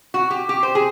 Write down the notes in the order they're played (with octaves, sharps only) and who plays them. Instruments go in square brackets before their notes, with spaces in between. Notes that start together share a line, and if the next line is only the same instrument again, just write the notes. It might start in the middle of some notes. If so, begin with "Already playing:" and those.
[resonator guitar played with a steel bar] F#4
G4
G4
C5
G#4